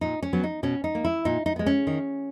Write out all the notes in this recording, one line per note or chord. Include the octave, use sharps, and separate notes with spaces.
A#2 D#4
C#4
F#3 B3
D#4
B2 C#4
D#4
A#3
E4
A#2 D#4
D#4
G#3 B3
C#4
D#3